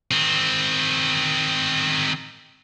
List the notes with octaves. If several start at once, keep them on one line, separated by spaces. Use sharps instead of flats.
D#3 C4